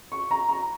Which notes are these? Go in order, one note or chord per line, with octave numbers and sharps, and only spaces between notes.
C#6
A#5
A#5